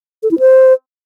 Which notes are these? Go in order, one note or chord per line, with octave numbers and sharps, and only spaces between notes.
A4
E4
C5